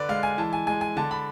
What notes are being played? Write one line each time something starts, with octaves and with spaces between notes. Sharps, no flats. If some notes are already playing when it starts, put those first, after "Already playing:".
Already playing: D3 B4 D5
G#3 F5
G#5
E3 A5
G#5
G#3 G#5
G#5
D3 A5
B5